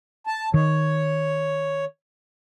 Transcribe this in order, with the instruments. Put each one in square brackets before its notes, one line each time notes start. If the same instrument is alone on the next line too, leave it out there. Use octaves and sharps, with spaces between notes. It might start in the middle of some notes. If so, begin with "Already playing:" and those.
[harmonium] A5
[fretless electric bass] D#3 [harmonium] C#5